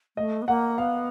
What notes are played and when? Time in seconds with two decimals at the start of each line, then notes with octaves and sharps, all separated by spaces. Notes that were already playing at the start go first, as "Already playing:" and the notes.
0.17 A3 D#5
0.42 B3
0.48 A#3 F#5
0.78 B3 F5